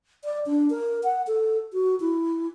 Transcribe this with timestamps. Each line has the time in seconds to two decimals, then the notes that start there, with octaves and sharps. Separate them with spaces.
0.24 D5
0.46 D4
0.70 A#4
1.04 F#5
1.27 A4
1.73 F#4
2.00 E4